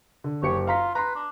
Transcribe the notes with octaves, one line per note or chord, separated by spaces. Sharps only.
D3
F#1 G4 C#5 C#7
F4 F5 A#5 B6
B4 A#5 C6
D4